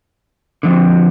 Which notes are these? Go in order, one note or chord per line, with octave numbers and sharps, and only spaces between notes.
D3 F3 C4